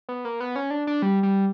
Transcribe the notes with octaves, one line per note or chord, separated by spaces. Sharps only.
B3
A#3
B3
C#4
D4
D4
G3
G3